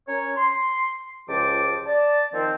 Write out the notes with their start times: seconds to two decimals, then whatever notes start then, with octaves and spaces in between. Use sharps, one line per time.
0.08 C#4 A#4 C#5
0.36 C6
1.29 C#2 F3 G4 A5 D6
1.87 D5 A5
2.33 D#3 F3 C4